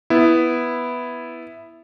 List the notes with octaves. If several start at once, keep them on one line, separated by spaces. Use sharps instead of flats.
B3 E4